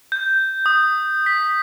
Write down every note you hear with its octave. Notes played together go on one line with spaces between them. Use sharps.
G6
D#6
B6